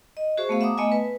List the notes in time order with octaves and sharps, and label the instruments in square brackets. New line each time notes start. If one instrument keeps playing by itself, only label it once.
[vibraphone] D#5
F#4 G#4 C5 E5 C#6
A3 B3 F5
E5 F#5 A#5 D6 D#6
A3 B3 D#5 E5 G#5
B4